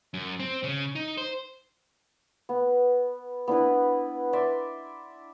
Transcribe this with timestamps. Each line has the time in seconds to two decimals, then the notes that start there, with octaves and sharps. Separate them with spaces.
0.14 F#2
0.39 C4
0.64 C#3
0.95 D#4
1.17 C5
2.49 B3
3.48 B3 D4 E4 B4
4.33 D5 E5 C6